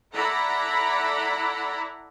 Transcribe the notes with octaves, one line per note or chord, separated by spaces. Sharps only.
E4 A4 D5 F#5 A#5 B5